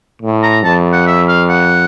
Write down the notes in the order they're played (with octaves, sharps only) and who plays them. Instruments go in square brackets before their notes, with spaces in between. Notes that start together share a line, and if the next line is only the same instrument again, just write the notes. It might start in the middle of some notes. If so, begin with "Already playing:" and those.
[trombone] A2
[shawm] A#5
[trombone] F2 [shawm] A5
[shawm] F#5
E5
F5
F#5